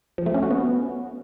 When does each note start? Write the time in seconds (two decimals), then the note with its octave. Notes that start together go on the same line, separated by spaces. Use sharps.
0.18 F3
0.26 A3
0.34 C#4
0.43 F#4
0.51 B3